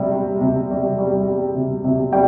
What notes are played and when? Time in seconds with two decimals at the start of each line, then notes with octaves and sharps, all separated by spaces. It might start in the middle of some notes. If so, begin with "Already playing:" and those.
Already playing: C3 G3
0.12 G3
0.41 C3
0.70 G3
0.98 G3
1.27 G3
1.55 C3
1.84 C3
2.12 G3 G5